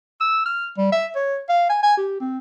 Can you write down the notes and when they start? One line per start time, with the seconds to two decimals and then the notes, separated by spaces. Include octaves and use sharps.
0.20 E6
0.46 F6
0.78 G3
0.92 E5
1.15 C#5
1.49 F5
1.69 G#5
1.83 G#5
1.97 G4
2.21 C4